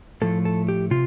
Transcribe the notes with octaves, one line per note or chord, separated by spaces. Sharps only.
A2 F3 A3 A4
A4
G4
C3 F4